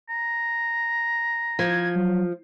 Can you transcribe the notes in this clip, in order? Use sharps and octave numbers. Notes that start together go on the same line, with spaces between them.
A#5
F3 G#6
F#3